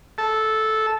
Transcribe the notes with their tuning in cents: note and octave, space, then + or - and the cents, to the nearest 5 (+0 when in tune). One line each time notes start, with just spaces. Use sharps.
A4 -10